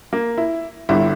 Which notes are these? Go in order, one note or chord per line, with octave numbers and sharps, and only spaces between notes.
A#3
E4
G1 G2 D3 E4